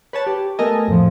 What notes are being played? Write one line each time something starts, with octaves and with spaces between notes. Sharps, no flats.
B4 C#5 A5
G4
A3 B3 A4 A#4 D#5 G#5
F2 A2 F3